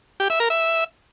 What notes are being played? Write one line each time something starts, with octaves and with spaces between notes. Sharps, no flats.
G4
E5
A#4
E5